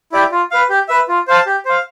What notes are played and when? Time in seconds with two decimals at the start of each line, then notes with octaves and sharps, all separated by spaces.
0.12 E4 G4 D5
0.32 F4
0.51 B4 F5
0.69 G4
0.88 B4 E5
1.08 F4
1.27 C5 F5 A5
1.46 G4
1.65 C5 F5